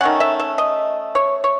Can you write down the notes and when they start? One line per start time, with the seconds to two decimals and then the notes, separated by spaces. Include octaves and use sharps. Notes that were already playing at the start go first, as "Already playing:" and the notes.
0.01 D#3 A3 C#4 F#5
0.20 E5
0.40 E5
0.58 D#5
1.15 C#5
1.44 C#5